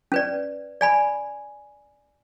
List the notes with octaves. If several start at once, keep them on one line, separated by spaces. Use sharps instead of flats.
C#4 B4 D5
D5 G#5 B5